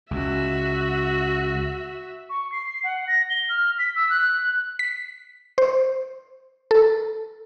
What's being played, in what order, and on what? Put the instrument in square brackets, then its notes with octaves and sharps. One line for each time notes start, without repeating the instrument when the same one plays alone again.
[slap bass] C#2 [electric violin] F#4 E5
[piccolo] C#6
C7
F#5
A#6
G7
F6
B6
E6
F#6
[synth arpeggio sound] B6
C5
A4